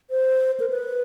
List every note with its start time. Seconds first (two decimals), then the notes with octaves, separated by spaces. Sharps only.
0.10 C5
0.60 A#4
0.70 B4